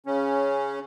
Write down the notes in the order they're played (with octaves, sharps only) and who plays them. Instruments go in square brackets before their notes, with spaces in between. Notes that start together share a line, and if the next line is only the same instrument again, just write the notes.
[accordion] C#3 C#4